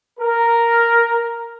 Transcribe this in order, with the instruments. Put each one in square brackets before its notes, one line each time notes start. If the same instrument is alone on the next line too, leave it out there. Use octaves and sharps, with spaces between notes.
[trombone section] A#4